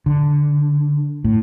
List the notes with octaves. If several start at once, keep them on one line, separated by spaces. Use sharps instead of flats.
D3
A2